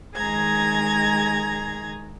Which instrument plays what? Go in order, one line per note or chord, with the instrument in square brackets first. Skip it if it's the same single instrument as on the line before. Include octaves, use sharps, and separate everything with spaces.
[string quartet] D#3 G#3 G#4 A#5 G#6 A#6